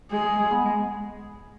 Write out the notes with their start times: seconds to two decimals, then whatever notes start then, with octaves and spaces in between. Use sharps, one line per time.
0.12 G#3 G#4
0.25 G#3
0.39 G#3
0.52 B3
0.65 G#3